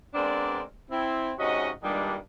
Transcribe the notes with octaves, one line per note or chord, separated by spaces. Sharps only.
G#3 B3 C4 D4 A#4 D5
C4 E4
G#2 C3 C#4 F#4 D#5
G2 A#2 D#3 G3 G#3 D4